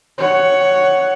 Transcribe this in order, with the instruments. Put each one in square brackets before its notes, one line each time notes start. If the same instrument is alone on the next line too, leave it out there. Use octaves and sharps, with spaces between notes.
[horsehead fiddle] C#5 F#5